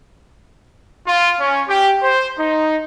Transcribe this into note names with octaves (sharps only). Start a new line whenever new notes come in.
F4
C#4
G4
C5
D#4